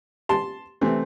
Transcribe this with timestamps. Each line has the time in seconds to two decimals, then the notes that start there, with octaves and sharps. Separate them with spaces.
0.29 A5 C6
0.81 C3 E3 A3 C4